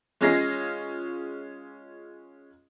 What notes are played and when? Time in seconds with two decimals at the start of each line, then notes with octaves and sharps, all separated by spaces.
0.21 G#3 C#4 F4 G#4 A#6 C7